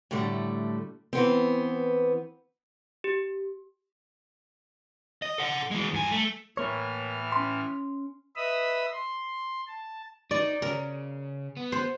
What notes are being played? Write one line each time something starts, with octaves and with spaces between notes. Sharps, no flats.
A2 D3 G3 A3
E3 B3 C4
G4
D#5
A4 F#5
E3 G#3
G2 G#5
A3
A2 E3 A#3 C#5 F6
C#4 C6
B4 D#5 E5 B5 D#6 E6
C6
A5
D#4 D5
C#3 A#4
B3
C5